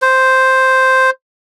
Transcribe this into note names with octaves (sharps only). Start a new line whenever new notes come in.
C5